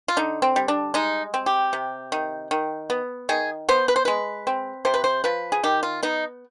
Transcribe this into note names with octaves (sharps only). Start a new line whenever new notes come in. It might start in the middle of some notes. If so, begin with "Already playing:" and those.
F4
D3 D#4
C4
G3
D4
G#3 D#4
C4
G4
C3
D#3
D#3
B3
D#3 G#4
B3 C5
B4
C5
G#3 B4
C4
C3 C5
B4
C5
F3 B4
G#4
D#3 G4
F4
B3 D#4